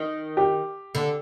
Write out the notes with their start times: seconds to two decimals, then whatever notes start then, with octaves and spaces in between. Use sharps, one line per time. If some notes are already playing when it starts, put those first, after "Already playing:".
Already playing: D#3
0.37 G4
0.95 D3